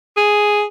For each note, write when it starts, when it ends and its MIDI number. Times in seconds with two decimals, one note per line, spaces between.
0.17 0.64 68